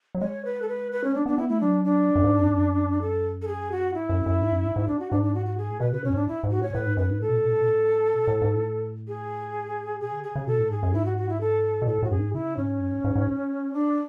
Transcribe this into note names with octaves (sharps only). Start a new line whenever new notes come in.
F#3
G#3 C#5
B4
A4
B4
B4
C#4
B3 D4
B3 D4
B3 E4
A3 E4
F#3 D4
D4
F#2
G#2
F#2
G#2
F#2
A4
A4
G#4
F#4
G#2 E4
F#2
F#2
G#2
F#2
G#2
G#2
D4
F#4
G#2 D4
D4
F#4
F#4
G#4
A2
B2 B4
C#3 B4
B2 C#4
F#2
G#2 D4
E4
G#2
F#4
A2 C#5
A2 B4
G#2
F#2 B4
G#2
A2 A4
B2
A2
B2
A2
B2
A2
B2
A2
G#2
A2
G#4
B2 G#4
D3
C#3 G#4
C#3
B2 A4
A2
G#2 G#4
F#2
G#2 E4
F#4
F#4
E4
A4
B2
A2 A4
A2 F#4
F#2 G#4
G#2
C#3 E4
G#2 C#4
F#2
G#2
G#2
G#2
D4